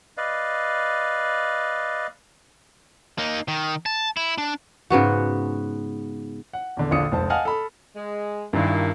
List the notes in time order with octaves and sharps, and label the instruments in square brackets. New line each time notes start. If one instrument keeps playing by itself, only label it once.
[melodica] B4 D5 D#5 F5
[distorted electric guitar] A#3 D#4
D#3
A5
E4
D4
[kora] G#2 C#3 B3 F#4
[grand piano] F#5
E2 D3
A#1 D3 D4 F4 D#6 C#7
F1 C#2 C5 A5
D#5 F5 F#5 G#5 A5 F6
A4 B5
[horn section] G#3
[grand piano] G2 D#3 [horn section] A#2 E4